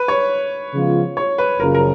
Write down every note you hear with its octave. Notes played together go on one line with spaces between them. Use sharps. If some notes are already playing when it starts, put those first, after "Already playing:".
Already playing: B4
C#5
C#3 F3 G#3 B3 F4
C#5
B4
F#1 F#2 C#3 F3 A#4
A#4